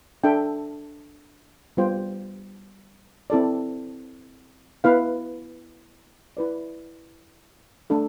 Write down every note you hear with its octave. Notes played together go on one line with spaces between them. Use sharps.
D4 A4 E5 G5
G3 B3 F4 C5 G5
C4 E4 A4 D5
B3 E4 B4 F5
E4 B4 D5
A3 D4 A4